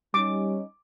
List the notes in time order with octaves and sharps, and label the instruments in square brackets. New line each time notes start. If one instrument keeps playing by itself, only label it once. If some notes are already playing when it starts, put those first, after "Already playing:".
[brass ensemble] G3 C#4 D#4 [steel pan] D6